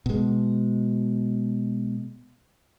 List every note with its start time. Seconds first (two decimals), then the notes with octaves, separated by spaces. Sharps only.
0.06 B2 G#3